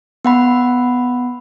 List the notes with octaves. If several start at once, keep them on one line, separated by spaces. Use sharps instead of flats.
B3 F#5 B5